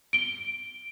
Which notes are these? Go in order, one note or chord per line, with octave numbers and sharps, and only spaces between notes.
D7 G7